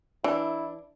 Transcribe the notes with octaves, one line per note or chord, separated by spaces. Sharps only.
E3 D4 E4